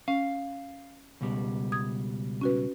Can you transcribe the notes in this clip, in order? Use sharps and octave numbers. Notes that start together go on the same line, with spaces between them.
C#4 F5
C#2 B2 G3
D#6 G#6
C#4 F#4 B4